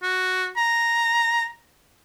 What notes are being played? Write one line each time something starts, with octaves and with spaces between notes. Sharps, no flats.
F#4
A#5